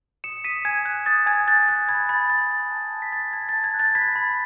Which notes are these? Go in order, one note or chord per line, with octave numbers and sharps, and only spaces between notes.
D#6 C#7 E7
D#6 B6 D#7
G#5 G#6
F#6 G#6
D#6 A6
G#5 G#6
F#6 A6
F#6 A6
B5 G#6
B5 A6
F#6 A6
B5
A5
F#6
B6
D#6 A6
A5 G#6
A5 A6
G#6
F#6
A6
B5 G#6 B6
B5